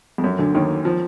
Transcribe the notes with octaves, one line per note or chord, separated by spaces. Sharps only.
F2
F#2
D2 D3
D#2 D#3
F3